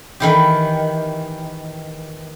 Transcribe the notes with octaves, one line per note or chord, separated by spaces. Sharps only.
D#3 E3 G4